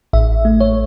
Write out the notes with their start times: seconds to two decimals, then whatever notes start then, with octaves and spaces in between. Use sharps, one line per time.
0.13 A1 E5
0.45 A3
0.60 C#5